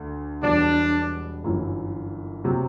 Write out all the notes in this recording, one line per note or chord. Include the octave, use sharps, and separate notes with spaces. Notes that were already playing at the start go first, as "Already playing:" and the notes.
Already playing: D2 D3 A3
E1 E2 B2 G3 B3 D4
G1 F#2 E3
C3 F#3